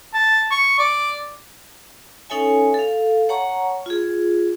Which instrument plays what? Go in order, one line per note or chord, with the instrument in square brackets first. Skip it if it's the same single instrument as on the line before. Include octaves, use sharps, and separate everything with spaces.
[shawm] A5
C#6
D5
[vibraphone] C#4 D#4 A4 C#5 E5 G#5
A4 F5
C#5 F#5 A5 A#5 C#6
F4 G#4